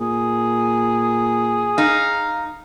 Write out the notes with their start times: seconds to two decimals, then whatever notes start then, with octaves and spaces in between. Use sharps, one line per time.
0.01 A#2 G#4
1.78 D#4 F5